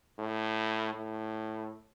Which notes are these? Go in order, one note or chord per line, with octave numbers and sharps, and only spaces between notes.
A2
A2